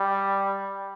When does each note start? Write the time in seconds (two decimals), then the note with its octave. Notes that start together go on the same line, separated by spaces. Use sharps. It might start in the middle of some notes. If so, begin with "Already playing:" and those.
Already playing: G3